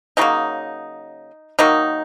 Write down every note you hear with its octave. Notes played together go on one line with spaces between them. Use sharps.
C#3 F#3 A#3 D#4
D#3 F#3 A#3 D#4